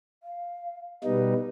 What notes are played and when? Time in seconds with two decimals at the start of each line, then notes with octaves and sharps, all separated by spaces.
0.23 F5
1.04 B2 G3 D#4 B4